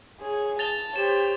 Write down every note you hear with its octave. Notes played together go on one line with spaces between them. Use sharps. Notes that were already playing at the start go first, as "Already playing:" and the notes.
G#4 C#5
A5 A6 F7 G7
G4 C5 C#5 E7